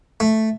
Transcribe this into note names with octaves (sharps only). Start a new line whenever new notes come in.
A3